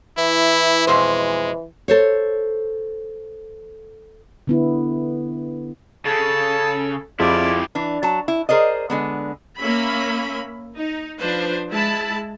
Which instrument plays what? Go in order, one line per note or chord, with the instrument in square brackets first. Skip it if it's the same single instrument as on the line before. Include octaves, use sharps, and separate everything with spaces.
[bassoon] E3 [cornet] E4
[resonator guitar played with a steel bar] F2 B2 C5 [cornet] G#3
[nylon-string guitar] A4 C5 C#5
[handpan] D3 B3 E4
[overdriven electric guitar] C#3 [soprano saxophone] A4 [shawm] A5
[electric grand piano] F2 F4 G#4 [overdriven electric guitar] E4 G4 [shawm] D5
[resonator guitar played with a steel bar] E3 D4
F#3 A5
E4
G#4 A#4 C5 D5 D#5
D3 G#3 B3
[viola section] A#3 C#4 E5 B5
D#4
F3 D4 B4 C5
G#3 E4 A5 B5